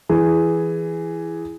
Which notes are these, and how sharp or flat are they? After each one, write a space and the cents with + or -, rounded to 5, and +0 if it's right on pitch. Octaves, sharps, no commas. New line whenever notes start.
E3 +10 G#4 +0